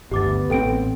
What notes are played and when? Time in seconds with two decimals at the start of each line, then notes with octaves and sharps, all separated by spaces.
0.11 G1 D2 B3 G4 D6 A6
0.50 A1 C4 A4 G5 D7